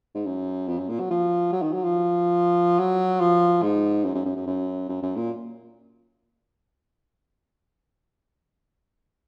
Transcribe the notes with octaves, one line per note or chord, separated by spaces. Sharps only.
G#2
F#2
F2
F#2
A#2
F#3
F3
F#3
D#3
F#3
F3
F#3
F3
G#2
F#2
F#2
F#2
F#2
F#2
F#2
F#2
A#2